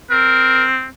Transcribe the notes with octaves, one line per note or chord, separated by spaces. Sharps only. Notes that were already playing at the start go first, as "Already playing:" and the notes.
C4 A#4